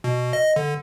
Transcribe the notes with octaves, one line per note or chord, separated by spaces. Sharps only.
B2
D#5
D3